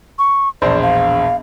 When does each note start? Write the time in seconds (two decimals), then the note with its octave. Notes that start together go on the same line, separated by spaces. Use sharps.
0.19 C#6
0.62 E1 A#1 C5 D5
0.82 F5